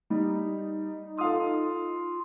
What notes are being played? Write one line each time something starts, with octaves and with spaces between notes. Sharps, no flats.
G3 D#4
F4 A4 F5 D#6